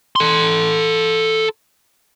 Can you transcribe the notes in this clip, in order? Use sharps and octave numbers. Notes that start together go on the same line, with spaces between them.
A4 C6